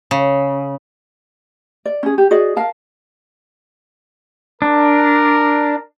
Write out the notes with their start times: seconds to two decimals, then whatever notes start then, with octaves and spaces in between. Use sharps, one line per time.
0.11 C#3
1.85 D5
2.03 C#4 G#4
2.18 G4
2.31 F#4 G#4 D5 D#5
2.57 A#4 F5 A5
4.62 D4 A#4